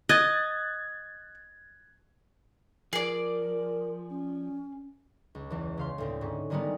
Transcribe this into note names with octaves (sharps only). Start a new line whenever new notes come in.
D#5 F#6 G#6 A6
F3 G#4 A#4 D5
C#4
C#2
E2 E3
C#3 F5 C6
D2 A2 C4
G#2 C#4
D3 D#3 G3 G#3 B3 D#4